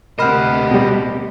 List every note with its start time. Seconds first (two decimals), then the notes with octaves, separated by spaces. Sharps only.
0.19 D2 C3 G4 A#4 D#5 F#5 B5 F6
0.71 B2 G3